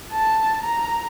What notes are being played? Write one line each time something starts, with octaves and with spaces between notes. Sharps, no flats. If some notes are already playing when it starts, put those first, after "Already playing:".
A5
A#5